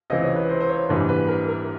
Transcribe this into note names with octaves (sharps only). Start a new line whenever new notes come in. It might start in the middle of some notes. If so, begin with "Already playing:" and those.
C#2 C3 E3 D#5
C#5
B4
C5
C5
C#5
A#1 G#2 E3 G3 B4
B4
A#4
A#4